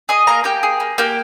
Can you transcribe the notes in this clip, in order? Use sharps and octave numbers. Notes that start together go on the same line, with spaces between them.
G#4 D#5 D#6
A#3 A#4 A#5
A#3 G4 G5
G#4
A#3
A#3 G4 G5